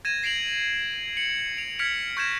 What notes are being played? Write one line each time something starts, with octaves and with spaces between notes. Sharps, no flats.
G#6 A#6 D#7 E7
A#6 C7 D7 F7 F#7
C#7 F#7
D7 F7
F6 G#6 B6 C#7 D7 F7
C#6 G6 G#6 A#6 E7